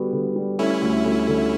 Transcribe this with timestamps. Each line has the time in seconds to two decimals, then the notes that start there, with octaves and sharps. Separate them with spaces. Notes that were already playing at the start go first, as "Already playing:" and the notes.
Already playing: D3 G3 B3 F#4
0.13 D3
0.36 G3
0.59 A3 C#4 E4
0.81 D2
1.04 D2
1.28 D3